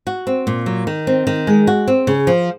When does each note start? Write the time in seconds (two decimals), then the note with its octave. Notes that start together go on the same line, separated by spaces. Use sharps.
0.07 F#4
0.27 C4
0.47 A#2
0.66 F#3
0.87 D#3
1.07 C4
1.27 D#3
1.47 G#3
1.67 F#4
1.88 C4
2.07 C#3
2.27 F3